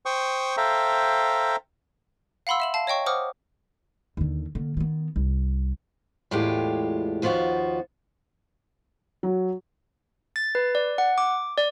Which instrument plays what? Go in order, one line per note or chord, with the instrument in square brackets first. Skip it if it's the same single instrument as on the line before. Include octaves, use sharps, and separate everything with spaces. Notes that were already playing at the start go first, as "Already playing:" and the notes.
[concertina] C5 G5 C#6 D#6
A4 C5 E5 F5 G5 A#5
[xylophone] F5 F#5 B5 C6 E6
E5 E7 F#7
F5 A5
C#5 D#5 G5 C#6
C5 F#5 D6 D#6 F6
[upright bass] D#2 D3
D3 A#3
D#3 B3
C2
[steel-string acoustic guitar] E2 A2 G#3 F4 G4
D#2 F3 B3 F4 F#4
[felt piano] F#3
[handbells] A6
B4
D5
F#5
D6
D5